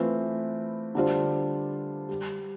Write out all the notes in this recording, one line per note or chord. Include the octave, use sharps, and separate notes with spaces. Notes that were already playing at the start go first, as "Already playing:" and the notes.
Already playing: E3 A3 C4 F4 B4
D3 G3 D4 F4 C5
G3